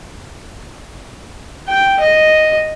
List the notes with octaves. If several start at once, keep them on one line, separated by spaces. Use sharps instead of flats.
G5
D#5